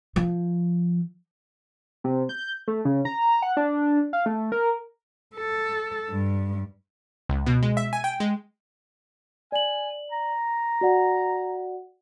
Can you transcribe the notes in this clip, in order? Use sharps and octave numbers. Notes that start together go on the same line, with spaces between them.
F3
C3
G6
A3
C#3
A#5
F#5
D4
F5
A3
A#4
A4
G2
C#2
B2
G#3
E5
G#5
G5
G#3
D5 G#5 F#7
A#5
F#4 D5 F#5